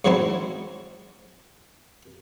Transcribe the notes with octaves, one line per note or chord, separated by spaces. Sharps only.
G#2 C#3 F#3 C4 E4